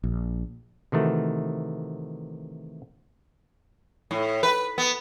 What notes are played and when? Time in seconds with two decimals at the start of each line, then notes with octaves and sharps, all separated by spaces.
0.04 A#1
0.92 C3 D#3 E3 A3 F#4
4.11 A2
4.43 B4
4.78 B3